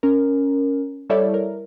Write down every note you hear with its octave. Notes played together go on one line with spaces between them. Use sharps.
C#4 A#4
G3 E4 A4 C#5 D5 E5
A#4